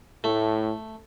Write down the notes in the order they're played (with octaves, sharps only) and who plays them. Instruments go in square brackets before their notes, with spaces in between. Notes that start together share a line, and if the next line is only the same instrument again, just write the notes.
[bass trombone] A2 [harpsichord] A3